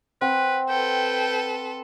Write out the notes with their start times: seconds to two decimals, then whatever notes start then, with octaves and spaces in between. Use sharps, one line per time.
0.21 C4 B4 F#5
0.69 A4 B4 G5